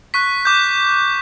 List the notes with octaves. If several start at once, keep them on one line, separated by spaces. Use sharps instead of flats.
C#6 F#6 B6
D6 G6